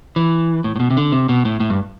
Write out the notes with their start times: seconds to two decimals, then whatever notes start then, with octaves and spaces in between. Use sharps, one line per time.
0.16 E3
0.64 A2
0.76 A2
0.80 B2
0.90 C3
0.97 D3
1.12 C3
1.29 B2
1.45 A2
1.60 A2
1.70 G2